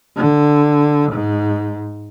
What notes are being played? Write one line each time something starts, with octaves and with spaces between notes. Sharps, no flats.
D3
G#2